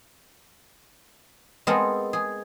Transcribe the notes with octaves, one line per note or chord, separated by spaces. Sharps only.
G#3 B3 C4 A4 A#4
G#4